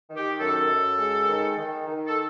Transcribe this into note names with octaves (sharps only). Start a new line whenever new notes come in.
D#3
G4
F#2 A4
F#2
G#3
D#3
D#3
D#3
A4